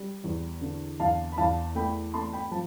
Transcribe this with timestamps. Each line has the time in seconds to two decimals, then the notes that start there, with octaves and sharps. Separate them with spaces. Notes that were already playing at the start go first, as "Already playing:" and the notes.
Already playing: G3
0.24 E2
0.61 D3
1.00 E2 F5 A5
1.32 B5
1.38 E2 F5 A5
1.75 A3 G5 B5
2.14 A3 A5 C6
2.33 G5 B5
2.51 F3 A5